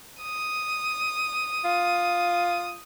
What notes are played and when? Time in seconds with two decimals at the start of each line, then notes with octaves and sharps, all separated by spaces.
0.22 D#6
1.65 F4